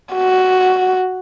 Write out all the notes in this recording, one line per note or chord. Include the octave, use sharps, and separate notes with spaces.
F#4